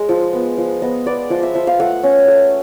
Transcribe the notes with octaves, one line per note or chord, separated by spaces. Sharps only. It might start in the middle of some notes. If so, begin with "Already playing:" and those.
Already playing: G#3 D#5
F3
B3
F3
B3 D#5
B3 D5
F3 D#5
E5
F3 E5
F5
A3 F#5
C#4
A3